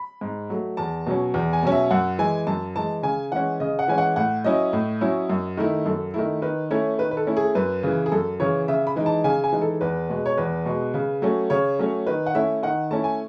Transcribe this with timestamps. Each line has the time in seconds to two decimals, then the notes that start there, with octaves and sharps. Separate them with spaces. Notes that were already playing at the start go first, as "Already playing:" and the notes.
Already playing: B5
0.21 G#2
0.50 F#3 A3
0.77 E2 A5
1.06 B2 F#3 C#4
1.34 E2
1.53 G#5
1.63 B2 F#3 C#4
1.72 E5
1.91 F#2 F#5
2.19 E3 G#3 G#5
2.47 F#2 A5
2.75 E3 G#3 A5
3.03 C#3 G#5
3.32 E3 G#3 C#4 F#5
3.60 C#3 D#5
3.79 F#5
3.88 E3 G#3 C#4 G#5
3.98 F#5
4.16 A2 F#5
4.44 F#3 C#4 E4 D#5
4.73 A2
5.01 F#3 C#4 E4
5.29 F#2
5.57 D#3 A3 E4
5.86 F#2 A4
6.14 D#3 A3 E4
6.42 D#3 B4
6.71 A3 C#4 E4 C#5
6.99 D#3 B4
7.11 B4
7.17 A4
7.27 A3 C#4 E4
7.37 G#4
7.55 F#2 B4
7.83 C#3 E3
8.06 G#4
8.12 F#2 A4
8.40 C#3 E3 C#5
8.68 C#3 E5
8.87 B5
8.96 E3 G#3 D#4
9.06 A5
9.24 C#3 G#5
9.44 G#5
9.53 E3 G#3 D#4
9.62 A4
9.81 E2 B4
10.09 B2 G#3
10.26 C#5
10.37 E2 B4
10.66 B2 G#3
10.94 C#3
11.22 F#3 A3 C#4
11.50 C#3 C#5
11.79 F#3 A3 C#4
12.07 D#3 B4
12.26 F#5
12.35 A3 C#4 E4 E5
12.63 D#3 F#5
12.91 A3 C#4 E4 A5
13.04 G#5